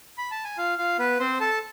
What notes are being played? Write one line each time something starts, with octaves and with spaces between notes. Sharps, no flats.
B5
A5
G#5
F4 F5
F4 F5
B3 B4
C4 C5
A4 A5